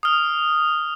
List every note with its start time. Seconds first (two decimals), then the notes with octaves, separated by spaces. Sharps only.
0.03 D#6 F6